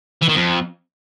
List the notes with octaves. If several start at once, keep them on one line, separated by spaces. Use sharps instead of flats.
E3
D#3
F2